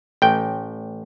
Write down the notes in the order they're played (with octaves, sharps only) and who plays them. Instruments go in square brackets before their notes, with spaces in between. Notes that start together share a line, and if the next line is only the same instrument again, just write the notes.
[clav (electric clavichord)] A1 G5